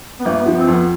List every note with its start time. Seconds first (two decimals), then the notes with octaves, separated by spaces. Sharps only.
0.19 B3
0.25 G1 A#3
0.41 F3 B3
0.57 C4
0.67 F2
0.73 B3